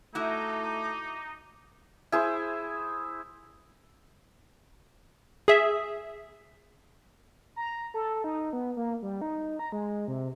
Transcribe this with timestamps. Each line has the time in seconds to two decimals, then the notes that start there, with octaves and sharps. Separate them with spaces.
0.15 A3 D#4 E4 F#4 D6
2.12 E4 G#4 C5
5.48 G#4 E5
7.56 A#5
7.94 A4
8.24 D#4
8.53 B3
8.77 A#3
9.02 G3
9.21 D#4
9.59 A#5
9.72 G#3
10.08 C3